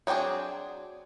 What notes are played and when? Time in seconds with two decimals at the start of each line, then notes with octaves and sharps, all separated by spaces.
0.07 F#3 B3 C4 D4 G#4